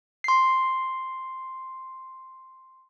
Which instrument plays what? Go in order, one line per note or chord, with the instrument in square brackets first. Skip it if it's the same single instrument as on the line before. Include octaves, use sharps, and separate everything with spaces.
[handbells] C6 C7